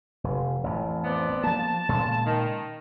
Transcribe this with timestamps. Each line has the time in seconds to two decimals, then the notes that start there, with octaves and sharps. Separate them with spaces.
0.24 F1
0.64 A1 F2
1.04 B3 C4 D5
1.44 F3 A#3 A5
1.89 A#2 C#3 G#3
2.26 D#3